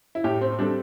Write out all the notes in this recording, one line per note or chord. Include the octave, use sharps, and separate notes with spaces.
E4
A2 G4
C4
G3 C4 D4 A4